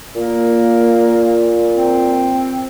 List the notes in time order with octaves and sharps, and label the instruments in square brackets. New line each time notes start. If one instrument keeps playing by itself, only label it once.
[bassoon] A#2 [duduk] A#3
[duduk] C4